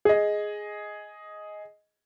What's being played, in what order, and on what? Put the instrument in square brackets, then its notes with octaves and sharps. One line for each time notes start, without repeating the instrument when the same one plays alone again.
[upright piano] G#4 D#5